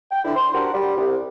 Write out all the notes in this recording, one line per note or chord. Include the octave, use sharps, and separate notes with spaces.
G5
D3 E4
C6
D4 F#4 G4 A#4 C5 F#5
G3
C2